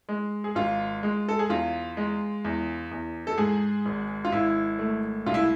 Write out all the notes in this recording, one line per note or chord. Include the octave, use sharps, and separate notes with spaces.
G#3
G#4
G#1 F4
G#3
A4
G#4
E2 F4
G#3
E2
E2
A4
G#2 G#4
G#1
F4
G#1 E4
A3
C2 F4
E4